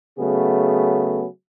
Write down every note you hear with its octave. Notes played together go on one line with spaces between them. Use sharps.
C#3 F#3 A3 B3 G#4